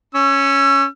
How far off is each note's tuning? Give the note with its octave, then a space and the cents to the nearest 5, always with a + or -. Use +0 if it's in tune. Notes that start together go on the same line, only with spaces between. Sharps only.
C#4 +0 E6 +35